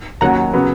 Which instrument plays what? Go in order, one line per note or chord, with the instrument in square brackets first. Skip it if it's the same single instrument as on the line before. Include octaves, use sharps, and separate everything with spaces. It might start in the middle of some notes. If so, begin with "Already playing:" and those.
[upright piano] D#2 D#3 F#3 C#4 [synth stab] F#5 A#5
[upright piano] C#3 F#3 B3